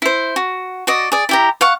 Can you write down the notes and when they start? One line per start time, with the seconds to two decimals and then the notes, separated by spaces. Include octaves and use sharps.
0.02 E4 C5
0.36 F#4
0.87 F#4 D5 D#5
1.12 G#4 D5
1.29 E4 G4 A#5
1.61 F5 F#5 C#6